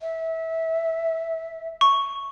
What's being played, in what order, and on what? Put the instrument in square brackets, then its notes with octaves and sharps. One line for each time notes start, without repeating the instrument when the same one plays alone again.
[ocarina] E5
[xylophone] C#6